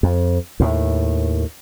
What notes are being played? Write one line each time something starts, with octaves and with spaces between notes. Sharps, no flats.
F2
D#2 A2